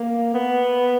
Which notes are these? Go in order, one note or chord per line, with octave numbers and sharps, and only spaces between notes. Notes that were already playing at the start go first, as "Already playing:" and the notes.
Already playing: A#3
B3